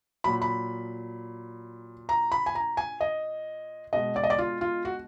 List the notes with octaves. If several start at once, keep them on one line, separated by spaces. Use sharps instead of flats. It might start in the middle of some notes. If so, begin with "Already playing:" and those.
A#2 F#3 B5
B5
A#5
B5
G#5
A#5
G#5
D#5
B2 G#3 D#5
D5
D#5
D5
F4
F4
F#4